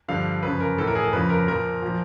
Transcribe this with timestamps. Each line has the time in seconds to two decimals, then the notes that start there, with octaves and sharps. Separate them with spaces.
0.08 G2 D3 F3 F5
0.43 F#2 C#3 F3 B4
0.60 A#4
0.78 A2 E3 A4
0.87 A#4
0.95 G#4
1.04 A4
1.13 F2 C#3 F3 B4
1.30 A#4
1.47 A#2 F3 A#4
1.82 A#2 F3